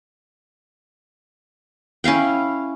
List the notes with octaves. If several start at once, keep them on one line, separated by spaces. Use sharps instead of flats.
C#4 E4 F5 G5